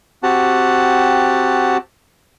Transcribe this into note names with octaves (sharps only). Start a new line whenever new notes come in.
C4 F#4 G4 F#5 A5